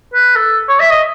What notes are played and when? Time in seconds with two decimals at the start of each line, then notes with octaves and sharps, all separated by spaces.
0.14 B4
0.36 A4
0.68 C#5
0.80 E5
0.90 D#5